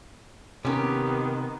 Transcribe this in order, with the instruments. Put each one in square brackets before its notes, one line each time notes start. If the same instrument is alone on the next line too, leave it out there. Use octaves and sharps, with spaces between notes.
[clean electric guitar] C3 [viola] D#3 B3 [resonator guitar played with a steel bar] C#4 G4